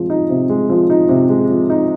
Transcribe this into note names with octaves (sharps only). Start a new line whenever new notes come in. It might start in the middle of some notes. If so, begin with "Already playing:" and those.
Already playing: C3 F3 G#3
D#4
C3
G#3
F3
D#4
C3
G#3
F3
D#4